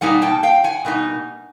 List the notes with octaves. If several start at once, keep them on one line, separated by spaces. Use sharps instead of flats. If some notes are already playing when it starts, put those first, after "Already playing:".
B2 G3 A#3 D#4 F#5 G#5
G5 A5
F5 G5
F#5 G#5
B2 G3 A#3 D#4